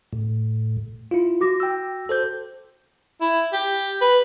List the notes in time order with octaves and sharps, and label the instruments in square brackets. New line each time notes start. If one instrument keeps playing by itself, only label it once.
[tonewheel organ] A2
[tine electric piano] E4 F4
[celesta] F#4 D6 A#6
[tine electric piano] G5 E6
A4 C5 G6
[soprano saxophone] E4
G4
B4